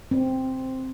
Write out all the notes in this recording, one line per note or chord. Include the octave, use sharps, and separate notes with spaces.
C4